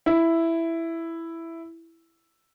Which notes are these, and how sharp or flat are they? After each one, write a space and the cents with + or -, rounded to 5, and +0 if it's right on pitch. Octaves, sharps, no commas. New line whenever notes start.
E4 +5